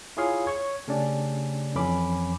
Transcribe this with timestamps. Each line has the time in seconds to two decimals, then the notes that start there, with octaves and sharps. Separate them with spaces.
0.17 E4 F4 G#4 C#5 F5
0.47 C#5 C#6
0.88 C#3 A3 C#4 D4 G4 D5
1.75 F2 E3 C#4 B5 D6